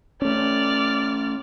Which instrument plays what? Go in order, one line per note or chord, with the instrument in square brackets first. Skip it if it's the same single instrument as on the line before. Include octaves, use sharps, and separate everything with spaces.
[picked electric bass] A3 C#4 [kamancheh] D5 F6